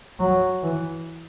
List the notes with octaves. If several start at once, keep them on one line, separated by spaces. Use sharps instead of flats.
F#3
E3